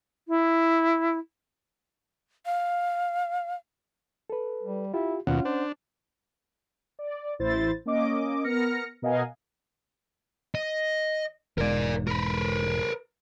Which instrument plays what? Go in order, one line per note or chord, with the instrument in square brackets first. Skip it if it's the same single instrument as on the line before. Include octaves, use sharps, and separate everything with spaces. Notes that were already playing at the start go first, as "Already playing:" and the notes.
[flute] E4
[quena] F5
[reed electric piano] A4 B4
[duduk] G3
[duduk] E4 [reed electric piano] F4 G4
[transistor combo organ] D#2 B2 [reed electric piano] C#4 F#5 [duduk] F4
[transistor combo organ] D4 [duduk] C5
[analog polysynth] D5
A1 E4 C5 A6
A#3 C#4 D#5 D6
B3 A#4 F6 A#6 C#7
B2 A#4 D#5 F5 F#5 G#5
[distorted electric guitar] D#5
[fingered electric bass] E1 G#2 [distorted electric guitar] A#4 D5
[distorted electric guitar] A#4 B4